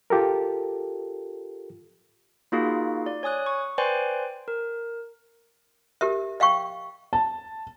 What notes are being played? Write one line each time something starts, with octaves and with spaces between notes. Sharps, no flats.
F4 G4 A4 A#4
A#3 D#4 F4 F#4 G#4 F5
D5
C#5 G#5 D#6 F#6
C#6
B4 C5 D5 G5 G#5 C6
A#4
G4 A#4 E5
D#5 F5 G5 C#6
A5